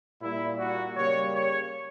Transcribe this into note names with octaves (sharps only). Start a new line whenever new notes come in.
A#2 G3 A#3 E4
F#4
C#3 G3 A#3 C#5
C#5